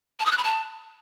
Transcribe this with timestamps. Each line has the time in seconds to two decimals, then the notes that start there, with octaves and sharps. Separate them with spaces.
0.20 A5
0.26 D#6
0.32 F#6
0.38 B5
0.44 A5